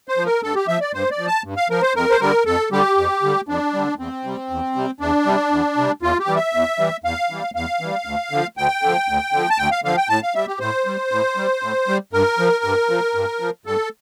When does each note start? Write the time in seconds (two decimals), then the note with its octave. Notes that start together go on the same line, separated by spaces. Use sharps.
0.08 C5
0.17 F3
0.26 A#4
0.43 G2 A4
0.55 G4
0.68 F3 E5
0.80 D5
0.94 G2 C5
1.11 D5
1.18 F3
1.27 A5
1.44 G2
1.57 F5
1.70 F3 A#4
1.82 C5
1.95 F2 A#4
2.11 C5
2.21 D3 G3 A#4
2.46 F2 A4
2.71 D3 G3 G4
2.97 F2
3.23 D3 G3
3.48 F2 D4
3.74 D3 G3
3.99 E2 C4
4.24 C3 G3
4.50 E2
4.76 C3 G3
5.00 E2 D4
5.26 C3 G3
5.52 E2
5.77 C3 G3
6.02 E2 F4
6.20 G4
6.28 E3 G3
6.36 E5
6.54 E2
6.79 E3 G3
7.04 E2 F5
7.30 E3 G3
7.55 E2 F5
7.81 E3 G3
8.05 D2
8.31 D3 F3
8.57 D2 G5
8.83 D3 F3
9.08 D2
9.33 D3 F3
9.50 A5
9.58 D2 G5
9.71 F5
9.84 D3 F3 F5
9.97 G5
10.09 A2 A5
10.23 F5
10.35 G3 E5
10.47 G4
10.60 A2 C5
10.86 G3
11.11 A2
11.37 G3
11.62 A2
11.88 G3
12.13 G2 A#4
12.39 F3
12.64 G2
12.90 F3
13.15 G2
13.40 F3
13.65 G2 A4